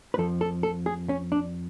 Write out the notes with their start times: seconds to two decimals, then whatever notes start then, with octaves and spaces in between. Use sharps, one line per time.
0.14 B4
0.18 F2 F3 A4
0.41 A4
0.63 A4
0.86 G#4
1.09 C#4
1.32 D4